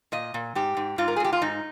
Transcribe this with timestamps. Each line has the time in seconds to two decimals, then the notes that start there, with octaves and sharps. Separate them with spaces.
0.12 A#2 D#5
0.34 A#2
0.55 G#2 G4
0.77 G#2
0.98 G#2 F4
1.08 A#4
1.16 G#4
1.20 G#2 G4
1.33 F4
1.42 G#2 D#4